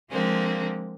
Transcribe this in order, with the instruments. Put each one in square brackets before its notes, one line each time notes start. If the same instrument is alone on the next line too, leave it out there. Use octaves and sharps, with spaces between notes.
[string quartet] D3 F3 G#3 A#3 C4